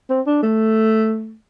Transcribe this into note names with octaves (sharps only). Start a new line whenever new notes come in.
C4
D4
A3